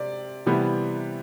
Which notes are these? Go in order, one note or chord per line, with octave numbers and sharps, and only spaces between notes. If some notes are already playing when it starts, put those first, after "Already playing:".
Already playing: C3 D5
C3 E3 G3 B3